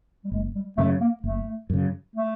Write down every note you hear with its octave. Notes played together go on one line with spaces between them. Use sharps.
G3
F#1 G#3
G3
F#2 C#3 A3
A#3
F#1 A3
F#2 C#3
A3